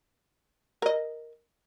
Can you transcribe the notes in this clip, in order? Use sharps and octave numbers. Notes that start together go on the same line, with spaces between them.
A#4 D#5